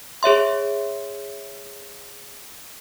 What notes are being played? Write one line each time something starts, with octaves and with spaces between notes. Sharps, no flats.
G#4 C#5 E5 C6